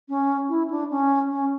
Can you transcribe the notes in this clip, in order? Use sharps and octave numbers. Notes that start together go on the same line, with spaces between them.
C#4
E4
D4
C#4
C#4